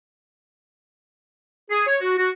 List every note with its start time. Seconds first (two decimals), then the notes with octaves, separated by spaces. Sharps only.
1.70 G#4
1.87 C#5
2.01 F#4
2.18 F#4